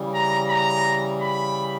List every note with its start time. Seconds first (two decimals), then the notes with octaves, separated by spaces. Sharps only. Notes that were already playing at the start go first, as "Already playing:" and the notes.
Already playing: C#3 E3 G3
0.15 A#5
0.50 A#5
1.21 B5